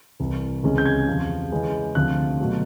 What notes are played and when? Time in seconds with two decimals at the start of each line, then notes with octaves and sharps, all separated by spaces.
0.20 C2 C3 E3
0.63 C#2 C3 E3 G#3 C#4
0.78 G6
0.86 G#6
1.07 E2 C3 F3
1.52 C#3 E3 G#3 C#4
1.95 D2 C3 F3 F#6
2.39 B2 F#3 A3